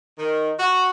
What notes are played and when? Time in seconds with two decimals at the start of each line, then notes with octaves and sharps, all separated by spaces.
0.17 D#3
0.58 F#4